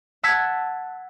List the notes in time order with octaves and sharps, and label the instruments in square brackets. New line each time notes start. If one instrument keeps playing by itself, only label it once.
[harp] F#5 A5 E6 F#6 G#6 B6